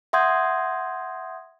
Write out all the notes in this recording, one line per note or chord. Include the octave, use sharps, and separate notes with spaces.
E5 F#5 C6 D#6 G6 G#6